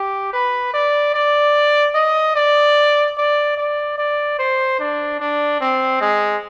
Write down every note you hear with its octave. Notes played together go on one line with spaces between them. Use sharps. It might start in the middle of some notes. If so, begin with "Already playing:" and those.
Already playing: G4
B4
D5
D5
D#5
D5
D5
D5
D5
C5
D4
D4
C4
G#3